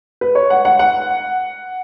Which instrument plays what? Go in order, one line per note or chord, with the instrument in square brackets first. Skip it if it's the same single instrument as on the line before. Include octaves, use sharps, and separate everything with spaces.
[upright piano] B4
C#5
F#5
F#5
F#5